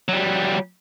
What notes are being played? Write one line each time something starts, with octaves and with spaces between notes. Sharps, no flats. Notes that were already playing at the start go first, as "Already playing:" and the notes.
F#3 G3